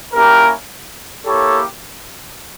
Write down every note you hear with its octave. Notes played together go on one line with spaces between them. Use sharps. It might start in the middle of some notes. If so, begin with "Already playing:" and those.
A#3 C#4 E4 G4 A#4
A#3 E4 G4 A4 C#5